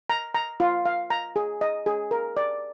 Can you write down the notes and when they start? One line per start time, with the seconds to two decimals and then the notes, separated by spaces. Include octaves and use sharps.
0.10 A#5
0.34 A#5
0.60 F4
0.86 F5
1.10 A#5
1.36 G#4
1.61 D#5
1.86 G#4
2.11 A#4
2.37 D5